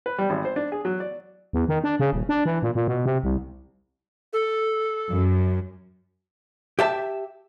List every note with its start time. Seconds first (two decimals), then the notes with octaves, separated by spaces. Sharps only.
0.06 B4
0.18 G3
0.30 G#1
0.45 C5
0.56 D4
0.72 G#4
0.85 F#3
1.00 D5
1.53 E2
1.69 D#3
1.84 D4
2.00 C#3
2.13 D#1
2.29 D4
2.45 E3
2.63 A#2
2.75 A#2
2.88 B2
3.05 C3
3.24 C2
4.33 A4
5.09 F#2
6.79 G4 E5 A5